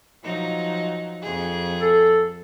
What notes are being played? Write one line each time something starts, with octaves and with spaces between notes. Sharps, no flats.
F3 F#3 D#4
F2 G#4
A4